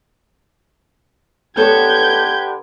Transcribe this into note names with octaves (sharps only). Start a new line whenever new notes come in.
D3 B3 G4 A4 B4 C#5 G6 G#6